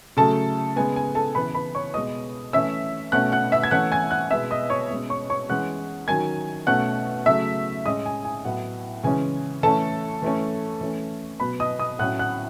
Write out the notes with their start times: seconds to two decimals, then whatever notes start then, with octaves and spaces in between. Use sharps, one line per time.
0.17 C#3 F#3 A3 A4 A5
0.76 C#3 G#3 B3 G#5
0.96 G#5
1.15 A4 A5
1.35 C#3 E3 B3 B4 B5
1.55 B4 B5
1.75 C#5 C#6
1.94 B2 G#3 B3 D#5 D#6
2.53 E3 A3 C#4 E5 E6
3.12 B2 A3 C#4 F#5 F#6
3.32 F#5 F#6
3.52 E5 E6
3.64 G#6
3.71 E3 A3 C#4 F#5 F#6
3.92 G#5 G#6
4.11 F#5 F#6
4.31 B2 G#3 B3 E5 E6
4.51 D#5 D#6
4.70 C#5 C#6
4.90 B2 G#3 C#4
5.10 C#5 C#6
5.30 C#5 C#6
5.49 E3 G#3 C#4 F#5 F#6
6.08 D#3 F#3 C#4 G#5 G#6
6.67 B2 A3 C#4 F#5 F#6
7.26 C#3 F#3 A3 E5 E6
7.85 A2 G#3 C#4 D#5 D#6
8.06 G#5
8.25 G#5
8.45 A2 F#3 B3 F#5
9.03 C#3 E3 G#3 C#4 G#5
9.63 E3 A3 C#4 A4 A5
10.22 E3 A3 C#4
10.81 E3 A3 C#4
11.40 B2 F#3 B3 B4 B5
11.60 D#5 D#6
11.79 D#5 D#6
11.99 A2 F#3 C#4 F#5 F#6
12.19 F#5 F#6